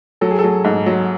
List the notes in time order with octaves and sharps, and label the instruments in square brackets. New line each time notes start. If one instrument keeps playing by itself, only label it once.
[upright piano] F#3 [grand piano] A4
[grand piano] G#4
A4
[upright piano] F#3
G#2
F#3